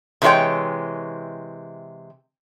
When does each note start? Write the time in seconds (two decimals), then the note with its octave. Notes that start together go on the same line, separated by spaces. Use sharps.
0.22 C3 E3 G#3 E4 C#5 G5